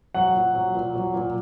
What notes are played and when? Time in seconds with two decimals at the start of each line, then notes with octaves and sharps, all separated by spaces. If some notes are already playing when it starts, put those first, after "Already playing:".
0.15 F#3 F#5
0.34 A#2
0.55 F#3
0.74 A#2
0.95 F#3
1.14 A#2